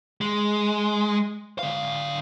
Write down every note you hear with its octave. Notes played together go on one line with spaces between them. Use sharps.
G#3
D3 F5